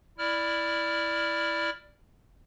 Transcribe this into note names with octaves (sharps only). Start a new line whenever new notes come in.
E4 D5 F6